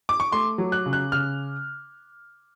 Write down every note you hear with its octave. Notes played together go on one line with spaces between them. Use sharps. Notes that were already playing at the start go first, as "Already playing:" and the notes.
D6
C#6
A3 C6
F#3
F#6
C#3
F#6
C#3 F6